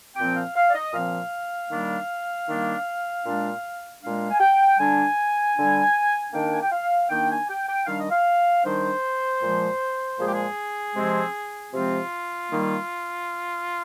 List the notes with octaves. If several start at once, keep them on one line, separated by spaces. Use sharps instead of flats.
A#2 F3 C4 G5
F5
F5
D5
D#5
A#2 F3 C4 F5
D#3 G3 A#3 D4
D#3 G3 A#3 D4
A#2 G#3 D4
A#2 G#3 D4 F5
G#5
G5
D3 G3 D4 G#5
D3 G3 D4
D#3 A#3 D4 G5
G#5
G5
F5
D#3 A#3 D4 G5
G#5
G5
G5
D#3 G3 D4 F5
D#5
F5
D#3 G3 D4 C5
A#2 F3 G#3
A#2 F3 G#3 G#4
G4
G#4
C3 F3 G#3 C4
C3 F3 G#3 C4 F4
D#3 G3 A#3